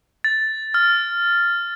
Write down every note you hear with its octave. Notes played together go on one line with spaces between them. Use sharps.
A6
F6